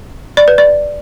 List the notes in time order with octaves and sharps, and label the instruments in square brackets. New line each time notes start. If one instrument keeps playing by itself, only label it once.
[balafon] D5
B4
D5